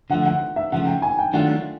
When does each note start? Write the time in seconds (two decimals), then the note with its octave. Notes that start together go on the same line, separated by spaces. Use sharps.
0.10 D3 F3 A3 F#5
0.26 F#5
0.56 E5
0.72 C#3 F3 A3 F#5
0.87 G5
1.02 G#5
1.19 G5
1.33 D#3 F#3 A3 D4 F4 F#5